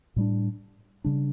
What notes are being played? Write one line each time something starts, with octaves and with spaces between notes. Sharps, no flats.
A2 G3 D4
C#3 G3 D4